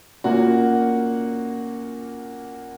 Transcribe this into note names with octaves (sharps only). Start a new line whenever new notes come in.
A#2 A#3 C#4 F#4 F#5